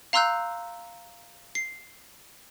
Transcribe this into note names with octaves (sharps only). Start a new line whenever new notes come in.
F5 A#5 C6 E6 F#6 G6
C7